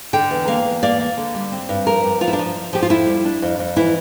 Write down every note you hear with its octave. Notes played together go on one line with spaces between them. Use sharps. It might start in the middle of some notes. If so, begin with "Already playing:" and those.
D3 G5
E2
A#3 F5
E2
A#3 D5
A#3
D3
G3
C4
G2
F3 A#4
G2
F3 F4
E4
D4
F3
F3
F3 G4
F4
F2 E4
G3
D4
F2
F2
E3 E4